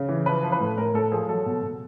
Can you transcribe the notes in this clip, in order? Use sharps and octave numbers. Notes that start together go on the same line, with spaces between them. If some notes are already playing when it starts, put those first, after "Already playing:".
Already playing: C#3
E3
F3 B4
F3
B4
A2
A2 A#4
A2 A4
F3 G#4
F#3 A4
B2
B2